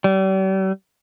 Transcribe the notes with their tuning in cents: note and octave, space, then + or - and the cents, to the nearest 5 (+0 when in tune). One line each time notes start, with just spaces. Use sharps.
G3 -40